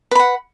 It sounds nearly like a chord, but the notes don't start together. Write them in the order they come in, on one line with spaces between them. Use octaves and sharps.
B4 B5 F#5